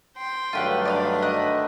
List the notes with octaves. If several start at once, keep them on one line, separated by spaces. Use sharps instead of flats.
G5 C6
G2 D3 D#3 F#3 A3 F4 G4 F#5
D4 D5 D#5 F5 B5
D#5 F#6